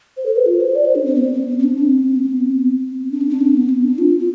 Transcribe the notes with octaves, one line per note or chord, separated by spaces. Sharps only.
C5
A4
B4
F4
C5
D5
C5
D4
C4
B3
C4
B3
C4
C4
D4
C4
B3
C4
B3
C4
D4
C4
D4
C4
B3
C4
D4
F4
F4